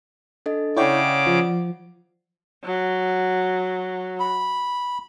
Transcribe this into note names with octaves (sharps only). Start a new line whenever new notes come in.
D4 A4 D#5
C#3 E4 C#5 D5 F#5 G5 D6
F3
F#3
B5